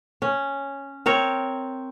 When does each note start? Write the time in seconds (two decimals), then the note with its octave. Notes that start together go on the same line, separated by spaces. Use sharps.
0.22 C#4
1.06 C4 A#4 C#5